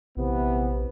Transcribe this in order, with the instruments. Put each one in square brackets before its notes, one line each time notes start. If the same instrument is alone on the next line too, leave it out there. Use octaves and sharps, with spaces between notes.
[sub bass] A#1 [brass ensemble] C3 E3 B3